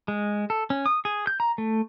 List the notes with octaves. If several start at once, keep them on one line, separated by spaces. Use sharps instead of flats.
G#3
A4
C#4
D#6
G#4
G6
A#5
A3